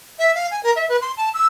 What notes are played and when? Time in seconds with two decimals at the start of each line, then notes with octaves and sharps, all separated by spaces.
0.19 E5
0.35 F5
0.51 G#5
0.63 A#4
0.76 E5
0.89 B4
1.01 C6
1.17 A5
1.34 E6